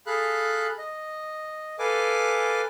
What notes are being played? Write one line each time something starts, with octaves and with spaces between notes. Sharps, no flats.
G#4 A4 F5 B5 F#6
D#5
A4 B4 F5 G#5 D6